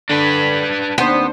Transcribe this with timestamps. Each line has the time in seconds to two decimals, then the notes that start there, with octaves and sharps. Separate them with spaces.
0.09 D3 D4 B4 D#7
0.98 D#2 B3 C4 D4 C5